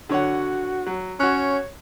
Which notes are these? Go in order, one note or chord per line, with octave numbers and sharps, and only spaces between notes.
D3 F#4 C#5 F#5
F#3
C#4 F#4 C#5 F#6